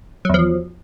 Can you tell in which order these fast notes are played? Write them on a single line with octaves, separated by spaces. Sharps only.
F#3 E2 F3